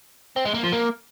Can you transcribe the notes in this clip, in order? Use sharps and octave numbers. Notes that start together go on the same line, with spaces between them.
C4
G#3
A#3
F3
A#3